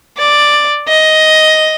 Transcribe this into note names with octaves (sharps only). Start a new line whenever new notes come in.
D5
D#5